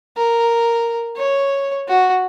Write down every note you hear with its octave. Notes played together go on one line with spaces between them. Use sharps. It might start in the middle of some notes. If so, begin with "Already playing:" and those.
A#4
C#5
F#4